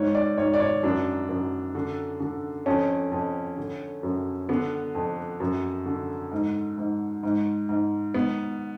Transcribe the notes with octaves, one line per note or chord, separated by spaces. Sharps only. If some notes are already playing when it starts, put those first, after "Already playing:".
Already playing: G#2 C#5
D5
G#2 C#5
D5
C#5
F#2 D4
F#2
D3
D3
F2 C#4
F2
D3
F#2
D3 B3
F2
F#2
D3
G#2
G#2
G#2
G#2
G#2 B3